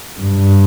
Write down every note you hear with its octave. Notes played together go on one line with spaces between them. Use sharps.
G2